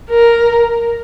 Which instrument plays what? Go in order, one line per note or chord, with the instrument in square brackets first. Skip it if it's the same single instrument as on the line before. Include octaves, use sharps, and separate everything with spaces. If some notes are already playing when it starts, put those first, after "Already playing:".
[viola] A#4